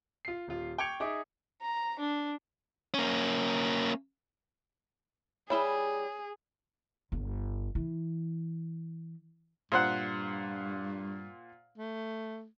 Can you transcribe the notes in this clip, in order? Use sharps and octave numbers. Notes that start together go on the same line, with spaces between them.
F4 C7
D#1 F4
G5 C#6 D6 G#6 C#7 F7
D#4 G#4 E5 D6
A#5
D4
A#3 C#4
G3 E4 G#4 C#5 E5 G7
G1
E3
G2 A#2 C5 F#5
A3